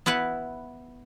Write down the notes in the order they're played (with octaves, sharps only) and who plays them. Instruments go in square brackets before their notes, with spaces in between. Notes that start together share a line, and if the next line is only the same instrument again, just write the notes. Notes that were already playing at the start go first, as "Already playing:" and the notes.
[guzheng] B3 E4 B4 F#5